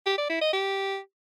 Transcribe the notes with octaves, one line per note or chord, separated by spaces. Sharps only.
G4
D5
E4
D#5
G4